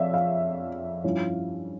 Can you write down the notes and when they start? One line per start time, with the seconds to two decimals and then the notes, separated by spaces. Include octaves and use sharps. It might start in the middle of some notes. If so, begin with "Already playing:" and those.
Already playing: F2 C#5 D5 E5 F5
0.14 F5
1.04 G2 F3 C#4 E4